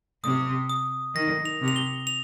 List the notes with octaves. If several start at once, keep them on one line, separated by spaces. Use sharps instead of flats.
C3 D#6
D#6
D#3 A#6
F7
C3
F7
G7
F7